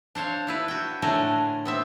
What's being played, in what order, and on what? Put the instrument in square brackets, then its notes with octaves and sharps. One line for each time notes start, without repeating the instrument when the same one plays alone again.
[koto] D4 C5 C#5 F5
D4 E4 B4
F#4 G5
A2 D3 A3 D4 A#4 G#5
B3 C4 E5